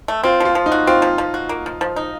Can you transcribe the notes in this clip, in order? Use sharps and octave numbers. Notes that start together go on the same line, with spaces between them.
A3
C4 F4
F3 F4
F3
D#4
F#4
C4 F4
F3
F3
F#4
A#3
F3
F3
D#4